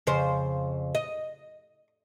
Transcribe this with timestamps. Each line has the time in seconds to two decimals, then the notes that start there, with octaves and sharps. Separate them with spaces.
0.07 F2 C#3 C5
0.95 D#5